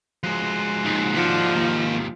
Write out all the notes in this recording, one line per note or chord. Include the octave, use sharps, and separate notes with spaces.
F3 G#3 F#4 C6
D#2 G#2
F3 D5 F#5
D#3 A#3